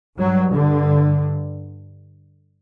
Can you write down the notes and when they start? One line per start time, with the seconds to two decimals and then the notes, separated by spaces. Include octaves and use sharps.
0.20 G2 F#3
0.54 D3